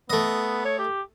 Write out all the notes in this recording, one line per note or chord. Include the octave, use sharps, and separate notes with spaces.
A3 B3 D#5
C#5
G4